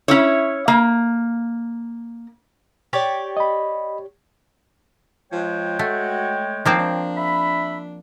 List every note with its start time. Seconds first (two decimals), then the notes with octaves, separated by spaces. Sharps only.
0.08 C#4 E4 C#5
0.68 A#3
2.93 G4 C#5 D5
3.37 D#5 B5
5.32 F3 G#3 C#5 G5
5.79 A3 F#4
6.65 D#3 F3 A#3 C4
6.79 D4
7.17 E5 B5